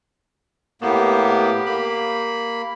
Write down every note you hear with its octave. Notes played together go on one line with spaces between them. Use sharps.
A2 A#3 B3 G4
A#3 B5